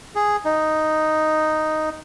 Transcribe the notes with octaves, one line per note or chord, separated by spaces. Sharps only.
G#4
D#4